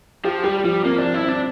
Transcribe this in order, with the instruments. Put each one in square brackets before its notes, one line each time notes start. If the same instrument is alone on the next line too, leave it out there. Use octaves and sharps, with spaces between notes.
[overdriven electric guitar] F3 [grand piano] G4
[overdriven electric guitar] G3 [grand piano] G4
[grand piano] F3 [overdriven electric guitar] G3
[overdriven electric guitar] A#3 [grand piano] C4
[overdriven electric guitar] D4
[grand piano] F3
[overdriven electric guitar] E4
[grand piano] C4 [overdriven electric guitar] D4